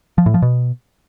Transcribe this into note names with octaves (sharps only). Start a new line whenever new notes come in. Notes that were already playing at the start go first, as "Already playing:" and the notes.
F3
A2
F3
B2